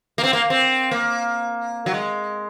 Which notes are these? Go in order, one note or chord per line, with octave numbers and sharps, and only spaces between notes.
A#3
C4
A#3
C4
A#3
F#3
G#3